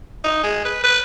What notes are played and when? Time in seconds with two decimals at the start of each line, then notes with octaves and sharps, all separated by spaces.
0.24 D#4
0.43 G#3
0.65 B4
0.84 B4